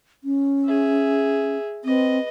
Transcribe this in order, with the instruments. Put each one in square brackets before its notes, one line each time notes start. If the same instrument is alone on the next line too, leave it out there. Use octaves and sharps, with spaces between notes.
[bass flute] C#4
[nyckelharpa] G#4 E5
[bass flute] C4 [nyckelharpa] B4 D#5